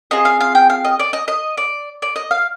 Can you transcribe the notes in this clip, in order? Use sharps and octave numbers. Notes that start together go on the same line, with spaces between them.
C4 F4 G#4 D#5
F5
F5
G5
F5
D#5
D5
D#5
D#5
D5
D5
D#5
F5